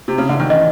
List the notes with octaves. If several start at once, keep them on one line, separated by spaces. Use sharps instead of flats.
C3
C#3
D3
D#3
E3 D#5